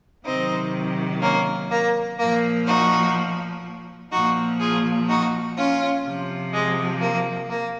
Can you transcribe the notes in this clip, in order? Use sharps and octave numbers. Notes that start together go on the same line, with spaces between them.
C3 D#3 F#3 C4 D#4
A#3 C#4
A#3
A#2 F3 A#3
D#4 F#4
A#2 F3 D#4 F#4
F4 G#4
D#4 F#4
C#4 F4
C3 F3
G#3
A#3
A#3